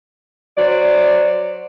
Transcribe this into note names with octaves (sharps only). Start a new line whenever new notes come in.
F#3 C5 D5